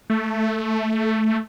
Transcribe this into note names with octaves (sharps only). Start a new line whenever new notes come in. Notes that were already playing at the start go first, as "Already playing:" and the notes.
A3